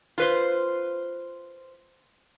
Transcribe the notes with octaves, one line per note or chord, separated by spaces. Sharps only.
F4 B4 C5